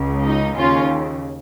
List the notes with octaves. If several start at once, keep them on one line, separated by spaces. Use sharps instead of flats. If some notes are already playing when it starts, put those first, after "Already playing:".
Already playing: C#2 C#3
D#4
D#2 C#3 C#4 F4